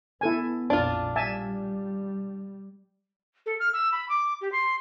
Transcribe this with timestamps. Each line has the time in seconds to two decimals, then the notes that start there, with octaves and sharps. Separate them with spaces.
0.21 B3 E4 A4 G#5
0.70 A#1 F2 D4 F4
1.16 G3 E5 G#5 A5
3.46 A4
3.60 F6
3.73 E6
3.92 B5
4.09 D6
4.41 G4
4.52 C6